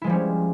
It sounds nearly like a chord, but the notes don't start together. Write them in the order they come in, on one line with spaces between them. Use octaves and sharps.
E4 G#3 F3 G3 C#4